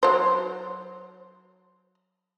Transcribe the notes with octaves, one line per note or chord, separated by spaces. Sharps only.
F#3 C5